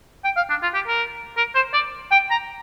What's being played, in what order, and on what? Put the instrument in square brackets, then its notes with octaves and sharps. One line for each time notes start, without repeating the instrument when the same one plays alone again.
[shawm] G5
F5
D4
F4
G4
A#4
A#4
C5
D5
G5
A#5